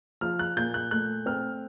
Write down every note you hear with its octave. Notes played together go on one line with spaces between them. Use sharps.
F3 F6
F#6
A#2 G6
F#6
A3 F#6
C4 F6